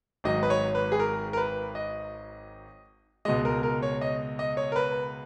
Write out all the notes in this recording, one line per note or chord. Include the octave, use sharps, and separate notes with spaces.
G#1 G#2 F#3 D#5
B4
C#5
B4
G#4
A#4
A#4
B4
D#5
C#2 B2 G#3 D#5
A#4
A#4
C#5
D#5
D#5
C#5
A#4
B4